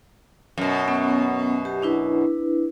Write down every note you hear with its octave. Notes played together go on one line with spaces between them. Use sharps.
F#2 B2
B3 C#4
G4
D4 E4 B4